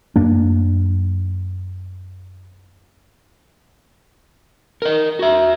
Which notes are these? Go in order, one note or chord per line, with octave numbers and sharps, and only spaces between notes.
F#2 A#3 D4
A#4 D#5
F#4 E5